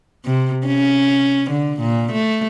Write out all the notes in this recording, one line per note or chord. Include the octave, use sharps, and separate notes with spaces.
C3
C#4
D3
A#2
A3